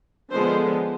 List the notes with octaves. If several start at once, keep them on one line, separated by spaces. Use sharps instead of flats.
D3 F3 G#3 B3 C5